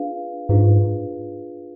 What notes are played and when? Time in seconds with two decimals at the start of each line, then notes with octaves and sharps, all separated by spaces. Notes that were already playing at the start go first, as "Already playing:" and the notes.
Already playing: D4 F4 G#4 B4 F5
0.49 G#2 D4 F4 G#4 B4 F5